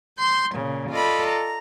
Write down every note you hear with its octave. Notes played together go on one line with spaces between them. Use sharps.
C6 G6
A#2 C#3
F4 A4 D5 D#5 B5
A#5